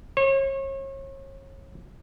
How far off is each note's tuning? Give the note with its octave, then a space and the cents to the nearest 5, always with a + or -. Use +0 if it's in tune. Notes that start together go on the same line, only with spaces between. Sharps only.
C#5 -35